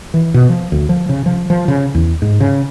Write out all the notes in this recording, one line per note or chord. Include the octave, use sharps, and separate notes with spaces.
E3
B2
F3
D2
F3
C#3
F3
F3
C#3
E2
G#2
C#3